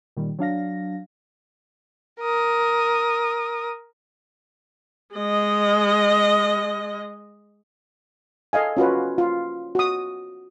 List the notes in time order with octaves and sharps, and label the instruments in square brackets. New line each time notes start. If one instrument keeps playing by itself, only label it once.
[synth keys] A#2 D#3 G3
F#3 D4 F5 A#6
[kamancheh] A#4 D#6
[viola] G#3 D#5
[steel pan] A4 D#5 F5 G#5
C#4 F4 F#4 B4
F4
F#4 D#6